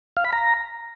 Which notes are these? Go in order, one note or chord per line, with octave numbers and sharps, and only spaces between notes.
F5
B5
A#5